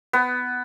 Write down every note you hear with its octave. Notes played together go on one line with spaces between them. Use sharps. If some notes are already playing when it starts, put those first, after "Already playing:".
B3